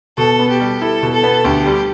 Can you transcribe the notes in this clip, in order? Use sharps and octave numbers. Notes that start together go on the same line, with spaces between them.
B2 A4
B3
G4
G3
E4 A4
B2
A4
B3
D2 G4
G3